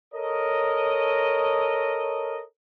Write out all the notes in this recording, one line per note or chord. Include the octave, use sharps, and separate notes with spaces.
A4 A#4 C#5 D#5